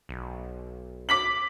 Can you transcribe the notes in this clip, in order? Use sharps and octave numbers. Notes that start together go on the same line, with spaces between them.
B1
D6 B6 F#7